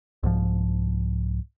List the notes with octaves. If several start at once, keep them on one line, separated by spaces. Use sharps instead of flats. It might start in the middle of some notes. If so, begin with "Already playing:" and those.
C2 G#2 F3